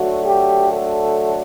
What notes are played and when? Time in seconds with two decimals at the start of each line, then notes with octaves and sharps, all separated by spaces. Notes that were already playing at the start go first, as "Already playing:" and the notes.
Already playing: D3 F#3 A3 F#4
0.26 G4
0.73 A4